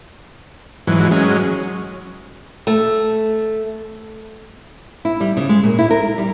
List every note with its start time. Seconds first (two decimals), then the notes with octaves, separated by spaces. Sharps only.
0.87 G#2 E3 F#3
1.11 F#3 G#3 C#4
2.67 A3
5.05 E4
5.21 G3
5.37 C#3
5.49 G#3
5.63 A#2
5.79 E4
5.91 A#4
6.18 G3